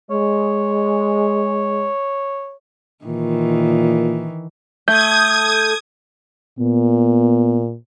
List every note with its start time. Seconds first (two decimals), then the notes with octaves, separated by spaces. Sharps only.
0.10 G#3 C#5
3.05 A#2 D#3 E3
4.88 A3 A4 D#6 G6 G#6
6.59 A#2 B3